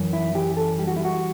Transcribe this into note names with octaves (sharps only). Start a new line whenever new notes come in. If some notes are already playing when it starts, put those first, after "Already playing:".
Already playing: F#2 E3
E4
E3 G4
A4
G3 G4
F#4
E4
F#4